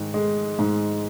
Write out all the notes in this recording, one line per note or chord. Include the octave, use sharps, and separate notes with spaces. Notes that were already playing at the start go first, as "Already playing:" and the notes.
Already playing: G#2 D#3
G#3
G#2